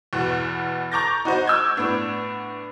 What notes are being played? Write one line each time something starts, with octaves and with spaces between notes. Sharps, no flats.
E2 B2 F#5
A#5 C#6 D6 G6 A6 A#6
D#4 F#4 C5 D#5
C#6 D6 E6 G6 G#6
A2 B3 D4